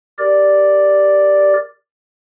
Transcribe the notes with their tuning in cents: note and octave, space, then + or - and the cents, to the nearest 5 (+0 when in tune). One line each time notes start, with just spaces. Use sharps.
G4 +0 A#4 +0 D5 +0